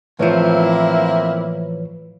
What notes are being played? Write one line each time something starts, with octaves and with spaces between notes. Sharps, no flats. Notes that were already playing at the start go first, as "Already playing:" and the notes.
A2 E3 F3 A#3 C4 E4 B4 C#5